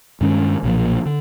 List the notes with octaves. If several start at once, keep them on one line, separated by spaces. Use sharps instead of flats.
G2 D#3 G#3 C#4
B1 A#2 F3
D3